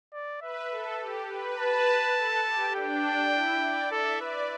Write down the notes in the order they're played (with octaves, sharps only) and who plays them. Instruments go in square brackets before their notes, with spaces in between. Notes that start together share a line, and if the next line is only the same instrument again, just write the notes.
[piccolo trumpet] D5
[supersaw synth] B4 [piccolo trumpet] E5
[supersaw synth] A4
G4
B4
[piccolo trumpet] A5
[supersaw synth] A4
G4
[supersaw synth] D4 [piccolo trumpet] G5
[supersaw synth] E4
D5
[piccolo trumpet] A4 [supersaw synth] E5
[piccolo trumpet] B4 [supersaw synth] D5